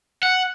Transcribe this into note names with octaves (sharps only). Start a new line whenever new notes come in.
F#5